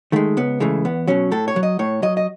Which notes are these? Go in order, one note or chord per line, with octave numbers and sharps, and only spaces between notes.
D#3 G#3 A3
C#2 B3
C#3 E3 G#3 A3
E2 B3
B2 F#3 C#4
A2 A4
C#5
F#3
D#5
A2 C#5
F#3 D#5
D#5